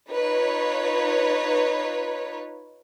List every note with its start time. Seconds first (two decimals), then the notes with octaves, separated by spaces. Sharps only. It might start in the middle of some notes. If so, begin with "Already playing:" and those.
0.10 D#4 F4 B4 C#5